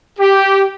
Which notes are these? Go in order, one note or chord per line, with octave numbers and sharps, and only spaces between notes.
G4